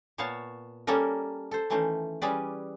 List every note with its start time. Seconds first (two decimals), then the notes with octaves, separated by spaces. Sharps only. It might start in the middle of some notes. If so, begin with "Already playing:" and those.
0.18 A#2 B3 C#5 F5 A5
0.87 G3 A#3 C#4 A4 A#4
1.51 A4 C5
1.70 D#3 E3 A3 C#4 C5
2.22 G3 C#4 G#4 B4 D5